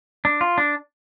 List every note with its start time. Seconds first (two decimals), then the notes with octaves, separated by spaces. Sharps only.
0.25 D4
0.41 F4
0.58 D4